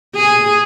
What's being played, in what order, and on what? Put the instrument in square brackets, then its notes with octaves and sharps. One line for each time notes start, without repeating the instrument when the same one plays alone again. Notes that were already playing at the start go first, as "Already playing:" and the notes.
[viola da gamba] G#4